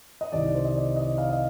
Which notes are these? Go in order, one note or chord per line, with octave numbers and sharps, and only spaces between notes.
D#5
C2 C3 D#3 D5
C5
D#5
D5
D#5
F5
D#5